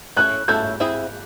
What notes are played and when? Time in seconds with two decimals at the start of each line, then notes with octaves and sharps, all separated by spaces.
0.16 A3 C#4 E4 A4 C#5 F#6
0.48 A3 C#4 E4 A4 C#5 G6
0.80 C4 E4 G#4